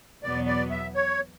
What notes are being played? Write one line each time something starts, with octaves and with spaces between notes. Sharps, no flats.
E2 B2 F#3 B3 D5
D5
E5
C#5